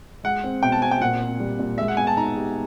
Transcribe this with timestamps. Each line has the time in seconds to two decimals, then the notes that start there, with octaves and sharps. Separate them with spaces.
0.24 G#3 F#5
0.44 C4
0.63 B2 G5
0.72 A5
0.82 C4 G#5
0.91 G5
1.01 A#2 F#5
1.21 C4
1.40 G3
1.59 A#2
1.78 G#3 E5
1.88 F#5
1.97 B3 G#5
2.07 A5
2.17 D#4 A#5
2.36 G4